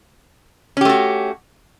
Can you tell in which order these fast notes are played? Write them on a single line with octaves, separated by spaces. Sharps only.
C#4 G4 A3 F#4